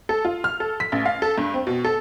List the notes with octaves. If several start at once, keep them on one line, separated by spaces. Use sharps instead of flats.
A4
F4
F6
A4
B6
A1
F5
A4
G2
C4
B2
A4